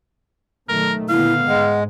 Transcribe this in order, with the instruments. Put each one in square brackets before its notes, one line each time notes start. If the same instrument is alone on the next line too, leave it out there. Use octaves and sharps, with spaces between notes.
[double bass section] B1 D#3 A3 [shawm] A#4
[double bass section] A#2 D3 B3 [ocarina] E4 [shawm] F5
[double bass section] G#2 [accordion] G#3 [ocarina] F#5